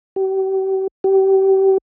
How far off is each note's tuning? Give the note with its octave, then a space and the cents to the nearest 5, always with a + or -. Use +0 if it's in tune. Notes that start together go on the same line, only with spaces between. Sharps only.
G4 -40
G4 -30